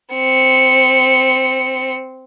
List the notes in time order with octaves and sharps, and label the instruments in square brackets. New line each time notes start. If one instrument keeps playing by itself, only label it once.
[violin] C4 C#7